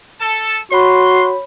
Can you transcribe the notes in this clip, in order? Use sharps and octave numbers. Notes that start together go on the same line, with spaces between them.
A4 A5
F#4 C#5 B5 C6